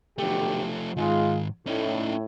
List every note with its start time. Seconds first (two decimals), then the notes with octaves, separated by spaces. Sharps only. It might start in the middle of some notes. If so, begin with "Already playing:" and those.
0.18 B1 D3 F3 A3 G4
0.97 G#2 D#3 G#3 F4
1.67 A2 C#4 D#4